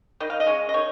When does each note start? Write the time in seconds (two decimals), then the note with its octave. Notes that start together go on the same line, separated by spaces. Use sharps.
0.20 D#3 D#5
0.30 F5
0.40 D#5
0.47 G#3 C#4
0.69 D#5
0.74 D#3 C#5